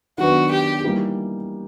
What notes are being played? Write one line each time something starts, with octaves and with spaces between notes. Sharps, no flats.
D#3 F#3 B3 D4 F#4
G4
E3 G3 A#3 D#4 G4